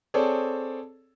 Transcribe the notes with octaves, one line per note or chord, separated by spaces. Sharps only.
C4 G#4 A4 C#5 D5